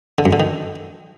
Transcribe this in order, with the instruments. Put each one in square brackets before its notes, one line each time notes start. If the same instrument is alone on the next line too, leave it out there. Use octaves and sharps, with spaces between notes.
[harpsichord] D3
F#2
D3
D#3